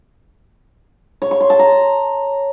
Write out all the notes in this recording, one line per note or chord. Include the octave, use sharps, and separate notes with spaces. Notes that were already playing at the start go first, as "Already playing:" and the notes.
C#5
C#6
C6
A5
A#5